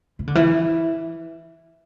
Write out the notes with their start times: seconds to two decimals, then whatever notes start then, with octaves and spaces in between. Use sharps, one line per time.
0.19 E3
0.27 D3
0.35 E3